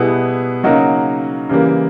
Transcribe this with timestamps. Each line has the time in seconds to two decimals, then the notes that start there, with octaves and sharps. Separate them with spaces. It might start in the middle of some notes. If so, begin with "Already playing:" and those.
Already playing: B2 G3 B3 E4 G#4
0.63 C#3 F#3 A#3 D#4 F#4
1.49 C#3 E3 G3 A#3